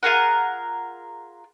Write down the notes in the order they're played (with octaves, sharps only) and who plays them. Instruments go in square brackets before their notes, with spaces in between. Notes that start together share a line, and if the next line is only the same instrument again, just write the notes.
[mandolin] F4 G#4 A#4 F#5